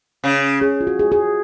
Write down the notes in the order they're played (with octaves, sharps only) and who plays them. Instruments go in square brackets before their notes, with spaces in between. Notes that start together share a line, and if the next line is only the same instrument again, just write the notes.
[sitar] C#3
[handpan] G#4
F4
F#4
G#4
G#4